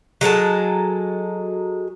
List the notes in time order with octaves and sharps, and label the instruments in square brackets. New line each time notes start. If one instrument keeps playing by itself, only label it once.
[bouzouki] F#3 G#3 A4 A5